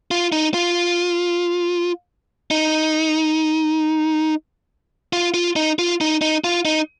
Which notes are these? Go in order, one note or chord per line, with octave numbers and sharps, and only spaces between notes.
F4
D#4
F4
D#4
F4
F4
D#4
F4
D#4
D#4
F4
D#4